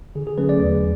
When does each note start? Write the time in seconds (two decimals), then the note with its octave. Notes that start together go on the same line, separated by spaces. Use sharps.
0.15 D3 G#4
0.27 G#4
0.38 F#3 A3 C#4 B4
0.49 D5
0.60 E2 D5